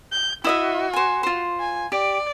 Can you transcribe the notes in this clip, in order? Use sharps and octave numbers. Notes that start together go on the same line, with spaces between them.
G6
E4 F#4 D#5 E5
C5 G#5
F4 C5
G#5
G4 D5